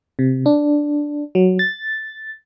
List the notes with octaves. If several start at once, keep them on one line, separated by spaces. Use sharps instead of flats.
C3
D4
F#3
A6